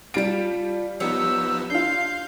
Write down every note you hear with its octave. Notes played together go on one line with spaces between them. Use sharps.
G3 F4 A5 D7
F3 B3 D#4 G4 C#5 E6
D4 F4 F5 G6 C7